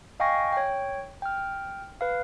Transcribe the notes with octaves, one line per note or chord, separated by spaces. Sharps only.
D#5 F5 G5 G#5 C#6 A#6
C#5 G5
G5 F6
B4 F5